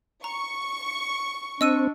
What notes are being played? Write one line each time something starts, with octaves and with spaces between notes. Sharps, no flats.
A#5 C#6
C4 D4 D#5 E6 D#7